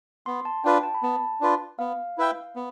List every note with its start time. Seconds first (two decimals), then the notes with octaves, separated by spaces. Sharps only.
0.26 B3 C6
0.45 A5
0.64 D4 F4 B4 G5
0.83 A5
0.94 B5
1.03 B3 A5
1.41 D4 F4 B4
1.79 B3 F5
2.18 E4 B4 E5 G5
2.56 B3